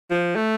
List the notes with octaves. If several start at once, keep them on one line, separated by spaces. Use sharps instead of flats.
F3
A3